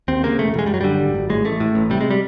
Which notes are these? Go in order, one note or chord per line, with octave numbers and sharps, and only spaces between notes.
D#2 C4
C#3 A#3
E1 A3
E1 G#3
G3
F#2 F#3
D3 G3
G#1
G#1
A2 G#3
A1 A3
A2
A1
C3 G3
G#3
G3